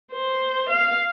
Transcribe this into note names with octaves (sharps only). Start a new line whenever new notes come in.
C5
F5